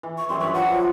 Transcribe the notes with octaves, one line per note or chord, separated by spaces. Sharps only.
E3
C#6
F#2 G3 E4 C6
G2 B4 B5 C#6
F3 F#3 F#5